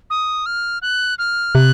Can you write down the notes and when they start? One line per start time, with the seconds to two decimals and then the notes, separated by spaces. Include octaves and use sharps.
0.10 D#6
0.46 F6
0.82 F#6
1.19 F6
1.54 C3 F#6